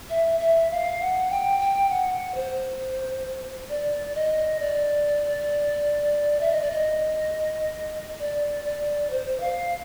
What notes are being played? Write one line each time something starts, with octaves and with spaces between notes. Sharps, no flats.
E5
E5
F5
F#5
G5
G5
F#5
C5
D5
D#5
D5
E5
D#5
D5
D#5
D5
D5
C5
F5